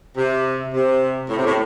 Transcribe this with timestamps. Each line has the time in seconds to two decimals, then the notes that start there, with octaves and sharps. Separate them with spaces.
0.17 C3
0.73 C3
1.29 A2
1.37 C3
1.45 A2